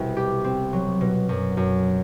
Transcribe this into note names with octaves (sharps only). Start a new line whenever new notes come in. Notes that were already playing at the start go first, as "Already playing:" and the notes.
Already playing: C2 B2
G4
C4
F#3
B2
F#2
F#2